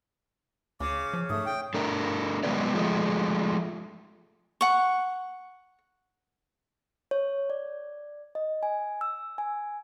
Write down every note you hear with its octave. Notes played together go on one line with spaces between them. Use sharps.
D2 C#3 D6
F3
G#2 A3 D#6
G5
A3 D4 A#4
F#3 G#3 B3 A#4 B4 D5
F3 G#3 A3
F#5 C#6
C#5
D5
D#5
G#5
E6
G#5